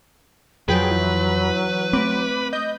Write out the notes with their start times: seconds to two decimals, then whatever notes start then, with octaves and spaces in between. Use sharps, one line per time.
0.69 F2 F3 F#3 G#4 B4 G5
0.91 E3
1.93 A3 C4 B5 D6
2.53 D#5 G6